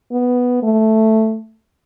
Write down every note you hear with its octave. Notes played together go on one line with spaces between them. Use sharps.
B3
A3